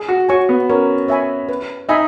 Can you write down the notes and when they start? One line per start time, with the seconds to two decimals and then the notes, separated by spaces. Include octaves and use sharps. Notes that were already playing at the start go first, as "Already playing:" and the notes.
Already playing: G#4
0.09 F#4
0.29 F#4 C#5 G#5 C#6
0.49 B3
0.70 C#4 A#4
1.08 C#5 E5 G#5 B5
1.49 B4
1.89 D#4 E5 G#5 B5